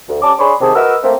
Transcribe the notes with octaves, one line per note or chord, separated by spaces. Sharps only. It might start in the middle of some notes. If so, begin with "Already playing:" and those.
D2
G3 C#4 A5 D6
D4 G#4 C#5 B5 C6
C3 D#3 G4 G#4 C5 A5
F#4 A#4 B4 D#5 E6
A3 A#3 C4